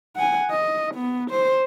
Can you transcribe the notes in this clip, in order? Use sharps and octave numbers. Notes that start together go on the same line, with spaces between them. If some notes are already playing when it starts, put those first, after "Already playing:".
F#5 G#5
D#5
B3
C5